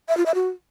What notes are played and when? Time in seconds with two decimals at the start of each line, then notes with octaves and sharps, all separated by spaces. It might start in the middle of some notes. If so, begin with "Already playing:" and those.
0.08 E5
0.17 F4
0.26 E5
0.34 F#4